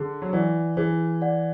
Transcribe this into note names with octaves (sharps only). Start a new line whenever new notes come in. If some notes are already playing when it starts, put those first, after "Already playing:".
Already playing: D3 G#4
F#3
E3 D5 F#5
E3 G#4
D5 F#5